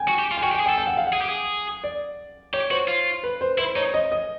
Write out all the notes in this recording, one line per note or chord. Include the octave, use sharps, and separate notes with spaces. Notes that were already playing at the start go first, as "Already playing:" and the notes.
Already playing: G5 G#5
F#4
G4
F4
G#5
F#4 G5
G4
G#5
G#4
G5
A4
G5
F#5
F5
F#5
G#4
G4
G#4
D5
G4 C#5
F#4 C5
F4
B4
C5
E4 C5
D#4 C#5
D#5
D#5